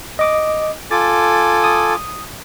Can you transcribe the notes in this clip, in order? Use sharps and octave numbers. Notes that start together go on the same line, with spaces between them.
D#5 D6 D#6
F4 A4 G#5 D6 A6
D#6